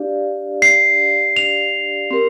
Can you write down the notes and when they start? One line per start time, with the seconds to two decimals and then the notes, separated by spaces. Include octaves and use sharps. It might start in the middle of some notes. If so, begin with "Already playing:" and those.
Already playing: D4 G4 D5 F5
0.62 C7
1.36 F7
2.11 C4 G4 A#4